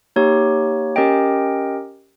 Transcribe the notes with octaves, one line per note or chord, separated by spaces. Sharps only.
A#3 D#4 G4 C#5
C#4 G4 A#4 D#5 G5